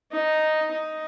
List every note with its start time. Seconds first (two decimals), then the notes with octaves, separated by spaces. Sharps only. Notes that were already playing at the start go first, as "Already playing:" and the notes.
0.11 D#4
0.72 D#4